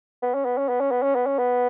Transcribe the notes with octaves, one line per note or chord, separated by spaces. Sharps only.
B3
C#4
B3
C#4
B3
C#4
B3
C#4
B3
C#4
B3